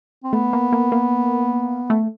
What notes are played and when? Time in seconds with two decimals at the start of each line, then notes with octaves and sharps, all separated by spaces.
0.24 C4
0.33 A3 B3
0.53 A#3
0.72 A#3
0.92 A#3
1.90 A3